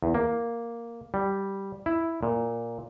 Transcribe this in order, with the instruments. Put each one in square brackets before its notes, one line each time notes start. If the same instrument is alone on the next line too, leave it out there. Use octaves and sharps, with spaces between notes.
[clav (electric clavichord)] E2
A#3
G3
E4
A#2